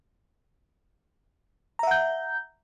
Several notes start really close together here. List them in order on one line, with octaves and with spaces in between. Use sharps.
A#5 E5 F#5 G6